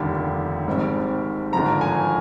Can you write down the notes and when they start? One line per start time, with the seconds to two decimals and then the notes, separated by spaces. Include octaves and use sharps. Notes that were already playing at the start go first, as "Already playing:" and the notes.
Already playing: F1 D#2 D3 G3
0.67 G#1 G#2 G3 C4
1.52 G#1 G2 D3 F3 A#5
1.81 G#5